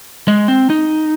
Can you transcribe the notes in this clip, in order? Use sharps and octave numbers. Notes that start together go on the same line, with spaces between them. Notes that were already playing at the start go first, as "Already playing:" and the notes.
G#3
C4
D#4